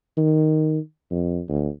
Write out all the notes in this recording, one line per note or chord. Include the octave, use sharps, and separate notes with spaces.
D#3
F2
D2